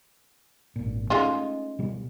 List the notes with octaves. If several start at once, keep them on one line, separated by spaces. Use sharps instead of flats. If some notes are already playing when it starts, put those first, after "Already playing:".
G#1 A#2
G#3 A3 C#4 D#4 F4
B2 G3